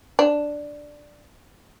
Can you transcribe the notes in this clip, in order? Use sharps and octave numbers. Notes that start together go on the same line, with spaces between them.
D4